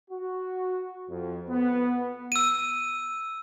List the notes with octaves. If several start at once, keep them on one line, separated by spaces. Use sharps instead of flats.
F#4
F2
B3
E6 D#7